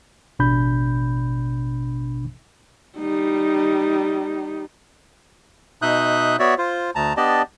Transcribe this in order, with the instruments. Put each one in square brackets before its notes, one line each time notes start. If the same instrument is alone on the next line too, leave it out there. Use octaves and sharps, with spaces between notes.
[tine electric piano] A1 B2 D4 B5 G6
[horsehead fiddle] G3 D#4
[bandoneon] B2 D#4 E5 D#6 F#6 G6
B3 F#4 C#5 D5 E5
F4 C5
D2 A5 A#5
B3 D4 G4 D5 D#5 A5